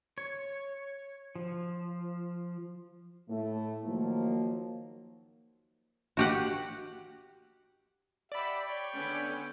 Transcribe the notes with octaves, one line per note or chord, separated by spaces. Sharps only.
C#5
F3
A2 A3
D#3 F3 F#3 A#3
F#4 G4 F#5
G4 D5 E5 F#5 B5
C#5 G5
D3 B3 C#4